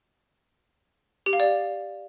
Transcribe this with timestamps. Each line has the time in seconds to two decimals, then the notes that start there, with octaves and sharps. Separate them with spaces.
1.26 G4
1.33 F5
1.40 D5